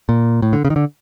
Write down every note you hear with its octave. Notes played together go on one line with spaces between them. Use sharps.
A#2
A2
D3
C#3
D#3
D3